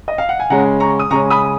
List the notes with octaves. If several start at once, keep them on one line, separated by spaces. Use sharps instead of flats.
D#5
F5
F#5
G#5
C#3 G#3 C#4 F#5 A#5
A#5 C#6
D#6
C#3 G#3 C#4 A#5 C#6
B5 D#6